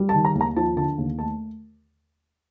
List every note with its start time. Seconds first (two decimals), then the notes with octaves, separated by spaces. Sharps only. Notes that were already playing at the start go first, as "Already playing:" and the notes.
Already playing: G3
0.09 A5
0.15 D#3
0.25 A#5
0.35 D#2
0.41 A#5
0.56 F3 A5
0.77 D3 A5
0.98 D#2
1.18 A3 A5